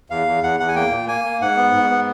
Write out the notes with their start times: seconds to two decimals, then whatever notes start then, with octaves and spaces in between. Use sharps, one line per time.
0.10 E2 F5
0.27 E2
0.43 E2 F#5
0.60 E2 F#5
0.68 G#5
0.76 A#3 G5
0.91 A#2
1.08 A#3 G#5
1.25 A#3
1.41 G#2 F#5
1.57 B3
1.74 G#2
1.90 B3